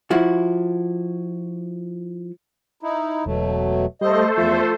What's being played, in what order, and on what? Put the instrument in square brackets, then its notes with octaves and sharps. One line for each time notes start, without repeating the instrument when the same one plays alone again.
[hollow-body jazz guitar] F3 E4 F#4
[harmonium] D#4 E4
[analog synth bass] E1 [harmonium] B2 F#3 A3
[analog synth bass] G3 [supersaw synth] A3 A4 C5 [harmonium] D#5
[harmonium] E2 E5 [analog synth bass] F3